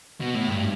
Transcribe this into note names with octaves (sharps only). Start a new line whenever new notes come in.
B2
A2
G2